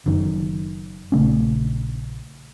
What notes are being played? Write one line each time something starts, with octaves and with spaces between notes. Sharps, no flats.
F#1 F#2 D#3
A#1 C#3 A3 C#4